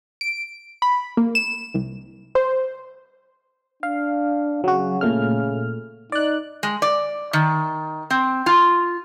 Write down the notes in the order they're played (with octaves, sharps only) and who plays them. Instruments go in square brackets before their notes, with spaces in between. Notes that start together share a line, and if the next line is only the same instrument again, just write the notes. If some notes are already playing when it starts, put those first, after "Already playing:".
[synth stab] D7
B5
A#3
E7
C2
C5
[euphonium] D4 [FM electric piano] F5
[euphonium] C#3 [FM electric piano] F#3 F#4
[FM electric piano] A#2 A3 F6
[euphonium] D#4 [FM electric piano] D5 F#6
[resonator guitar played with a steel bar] G#3
D5
D#3
C4
F4